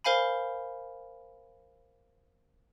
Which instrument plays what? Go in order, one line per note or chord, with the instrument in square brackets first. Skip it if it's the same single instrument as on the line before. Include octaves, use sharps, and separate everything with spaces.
[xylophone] A#4 C5 F5 G#5 B5